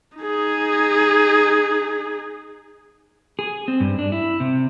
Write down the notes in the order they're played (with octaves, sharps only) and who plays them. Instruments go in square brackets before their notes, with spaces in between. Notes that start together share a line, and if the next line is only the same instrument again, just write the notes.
[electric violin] D#4 G#4
[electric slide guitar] G#4
C4
G2
D4
E4
C3